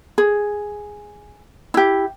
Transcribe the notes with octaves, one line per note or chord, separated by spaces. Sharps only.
G#4
E4 G4